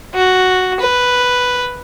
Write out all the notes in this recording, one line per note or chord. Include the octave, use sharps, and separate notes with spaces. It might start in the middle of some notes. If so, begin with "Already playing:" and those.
F#4
B4